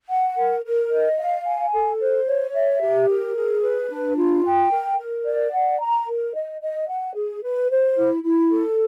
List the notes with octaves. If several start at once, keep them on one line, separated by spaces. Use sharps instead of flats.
F#5
A#4
A#4
D#5
F5
G#5
A4
C5
C#5
E5
G4
A#4
G#4
B4
D4
F4
G5
A#4
A#4
D5
F#5
A#5
A#4
D#5
D#5
F#5
G#4
B4
C5
E4
E4
A4